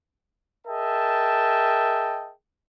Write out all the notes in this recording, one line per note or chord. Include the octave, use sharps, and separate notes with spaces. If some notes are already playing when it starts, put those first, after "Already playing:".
G#4 A#4 D#5 E5 G5 A5